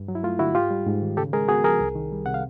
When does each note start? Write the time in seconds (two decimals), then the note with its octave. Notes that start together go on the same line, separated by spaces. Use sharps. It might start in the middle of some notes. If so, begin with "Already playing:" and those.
Already playing: G2
0.08 F#3
0.15 E4
0.23 A3 F4
0.39 D3 E4 F#4
0.55 G#2 F4 G4
0.71 G3
0.86 G#2
1.02 D#3
1.17 C#3 G4 A4
1.33 G#3 G#4 A#4
1.48 B3 F#4 G#4
1.64 F3 G#4 A#4
1.80 C2
1.95 D#3
2.12 G3
2.26 C3 F#5
2.34 F5